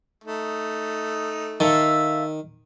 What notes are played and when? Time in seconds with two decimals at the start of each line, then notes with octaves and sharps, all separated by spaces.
0.24 A3 D#4
1.60 D#3 A4 E5 F5